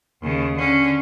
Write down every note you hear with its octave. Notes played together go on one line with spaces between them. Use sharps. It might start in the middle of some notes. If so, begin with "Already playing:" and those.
D#2 C#3
D3 C#4